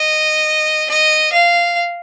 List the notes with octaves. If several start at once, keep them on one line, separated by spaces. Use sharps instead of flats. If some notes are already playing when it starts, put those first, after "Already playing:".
Already playing: D#5
D#5
F5